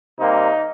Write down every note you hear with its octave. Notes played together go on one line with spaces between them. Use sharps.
C3 G3 A#3 D#4